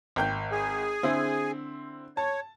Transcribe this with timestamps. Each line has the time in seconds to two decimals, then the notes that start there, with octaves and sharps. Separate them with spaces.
0.16 G#1 G5 G6
0.52 G#4 G#5
1.03 D3 C4 E4
2.17 C#5 A5